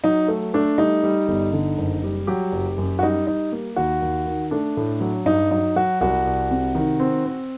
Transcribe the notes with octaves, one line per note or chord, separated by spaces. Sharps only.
F#3 D#4
A3
A3 D4
G3 D#4
G3
G1
D3
F#1
G3
F#3 G4
F#1
F#2
F#4
G3 D#4
G3 D#4
A#3
D#2 F#4
D#2
D#3
A3 D4
A2
F#3
G2 D#4
F#3 D#4
F#3 F#4
C2 F#4
C2
C3
D#3
C4
C4